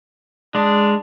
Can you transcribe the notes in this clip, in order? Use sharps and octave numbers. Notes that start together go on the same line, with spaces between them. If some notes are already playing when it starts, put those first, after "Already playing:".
G#3 D4